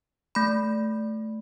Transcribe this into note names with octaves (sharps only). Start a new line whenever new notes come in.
A3 B5